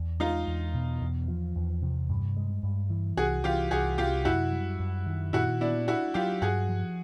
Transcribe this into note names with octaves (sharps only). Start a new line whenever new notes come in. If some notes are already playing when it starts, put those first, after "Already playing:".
Already playing: E2
G#3 D#4 F4
E2
B2
E2
F3
E2
C3
G2
G#3
G2
E3
C2 F#4 G#4
E3 F4 G4
C2 F#4 G#4
C3 F4 G4
F#2 E4 F#4
G3
F#2
D#3
A#2 E4 F#4
B3 D4 E4
D4 E4 F#4
F#3 F4 G4
G2 F#4 G#4
F3